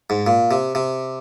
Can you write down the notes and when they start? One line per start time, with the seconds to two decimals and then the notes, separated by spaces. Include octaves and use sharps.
0.10 G#2
0.27 A#2
0.51 C3
0.75 C3